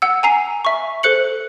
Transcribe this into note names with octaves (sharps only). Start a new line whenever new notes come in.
F#5 E6
G#5 A#5 C7
E5 C#6
A4 C5 F#6 C#7 F#7